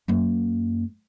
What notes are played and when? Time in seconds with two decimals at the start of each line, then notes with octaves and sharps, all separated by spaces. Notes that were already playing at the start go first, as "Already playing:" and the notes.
0.08 F#2 A#3